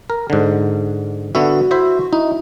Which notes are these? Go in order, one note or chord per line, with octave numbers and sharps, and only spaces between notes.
A#4
G#2 D3
D3 B3 F#4 E5
E4 C5 E5
D#4 E4